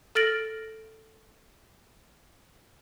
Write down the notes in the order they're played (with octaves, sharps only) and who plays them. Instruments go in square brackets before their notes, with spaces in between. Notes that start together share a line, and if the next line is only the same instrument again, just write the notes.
[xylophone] A4 F6 A6 A#6 D7 F#7